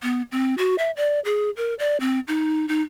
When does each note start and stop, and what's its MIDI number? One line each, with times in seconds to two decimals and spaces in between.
0.03 0.22 59
0.32 0.55 60
0.58 0.75 66
0.78 0.91 76
0.97 1.20 74
1.25 1.50 68
1.57 1.74 70
1.79 1.97 74
2.00 2.20 60
2.28 2.68 63
2.68 2.82 63